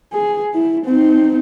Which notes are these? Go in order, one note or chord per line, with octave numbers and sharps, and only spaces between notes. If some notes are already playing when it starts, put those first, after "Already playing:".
G#4
E4
C4 D#4